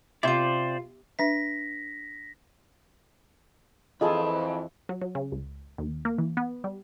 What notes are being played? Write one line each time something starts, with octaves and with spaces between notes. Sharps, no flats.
C3 E4 F4 C5 D5
D4 B4 E5 A#6 B6
F2 E3 F4 G#4 A4 D#5 F5 B5
F#3
F#3
C#3
C#2
D#2
A#3
E3
B3
G3